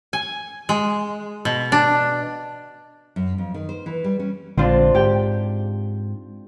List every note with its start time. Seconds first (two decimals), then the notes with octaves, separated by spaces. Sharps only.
0.13 G#5
0.69 G#3
1.45 B2
1.72 D4
3.16 F#2
3.38 F2
3.54 D#3
3.69 C5
3.86 E3
4.04 G3
4.20 C#4
4.58 A#1 D3 G#3 C4 D4 F4
4.95 G#2 G4 G5